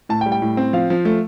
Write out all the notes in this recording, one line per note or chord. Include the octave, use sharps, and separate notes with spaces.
A2 A5
G5
G3
G5
A2
C4
F3 F5
F3
A3